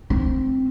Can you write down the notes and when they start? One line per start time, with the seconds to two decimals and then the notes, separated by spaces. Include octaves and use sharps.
0.10 C4